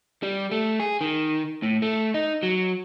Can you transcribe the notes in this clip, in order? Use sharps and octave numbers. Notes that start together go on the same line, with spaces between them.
G3
A3
G#4
D#3
A2
A3
D#4
F#3